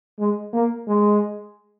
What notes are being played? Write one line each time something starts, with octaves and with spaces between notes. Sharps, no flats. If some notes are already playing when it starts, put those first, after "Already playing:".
G#3
A#3
G#3